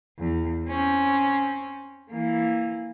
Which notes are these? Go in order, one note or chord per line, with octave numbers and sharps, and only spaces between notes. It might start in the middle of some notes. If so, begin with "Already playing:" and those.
E2
C4 C#4
E3 A#3